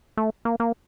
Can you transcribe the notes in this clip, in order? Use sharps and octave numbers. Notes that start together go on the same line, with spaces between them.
A3
A#3
A#3